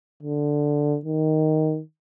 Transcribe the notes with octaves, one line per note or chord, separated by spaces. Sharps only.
D3
D#3